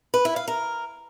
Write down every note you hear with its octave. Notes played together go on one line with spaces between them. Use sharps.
B4
E4
F5
A#4